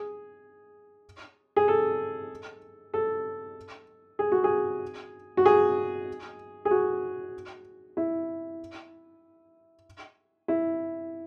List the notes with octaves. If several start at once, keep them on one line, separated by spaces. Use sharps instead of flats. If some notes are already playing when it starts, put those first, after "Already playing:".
Already playing: G#4
G#4
A4
A4
G#4
F#4
G#4
F#4
G#4
G#4
F#4
E4
E4